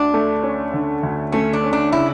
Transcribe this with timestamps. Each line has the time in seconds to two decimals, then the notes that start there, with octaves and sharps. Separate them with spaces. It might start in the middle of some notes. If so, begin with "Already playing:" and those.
Already playing: D2 D3 D4
0.14 A3
0.43 C#4
0.73 D3
1.03 D2
1.32 A3 C#4
1.53 D4
1.63 C#4
1.73 D4
1.92 C#3 E4